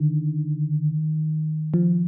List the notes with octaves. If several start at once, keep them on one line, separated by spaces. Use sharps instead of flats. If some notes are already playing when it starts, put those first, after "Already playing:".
Already playing: D3 D#3
F3